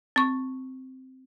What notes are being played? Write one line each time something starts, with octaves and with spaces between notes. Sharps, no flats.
C4 C#6